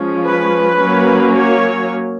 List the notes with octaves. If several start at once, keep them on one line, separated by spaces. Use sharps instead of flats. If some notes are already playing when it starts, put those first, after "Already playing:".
Already playing: F3 G#3 C#4
B4
F#3 A#3 C#4
C#5